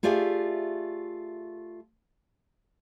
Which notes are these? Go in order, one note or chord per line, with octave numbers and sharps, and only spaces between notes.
A3 F4 G4 G#4 D5 E5